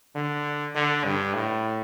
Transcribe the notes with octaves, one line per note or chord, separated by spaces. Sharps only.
D3
D3
G2
A2